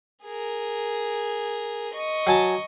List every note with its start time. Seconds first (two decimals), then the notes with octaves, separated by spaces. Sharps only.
0.24 G#4 A#4
1.94 D#5 C#6
2.27 F#3 G#5 A5